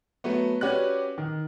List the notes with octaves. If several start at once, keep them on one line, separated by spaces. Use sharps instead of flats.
F#3 A3 B3
C#4 F#4 G4 B4 D5 F#6
D#3